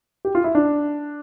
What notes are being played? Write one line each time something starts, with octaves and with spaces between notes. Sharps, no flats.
G4
F4
E4
D4